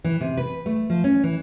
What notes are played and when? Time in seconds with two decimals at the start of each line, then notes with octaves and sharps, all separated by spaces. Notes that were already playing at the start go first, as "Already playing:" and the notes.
0.04 E3
0.21 C3
0.37 B4
0.66 A3
0.90 F3
1.04 C#4
1.23 E3